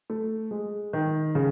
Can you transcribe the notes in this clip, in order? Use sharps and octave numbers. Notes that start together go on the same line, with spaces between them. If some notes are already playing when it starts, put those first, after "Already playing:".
A3
G#3
D#3
C#3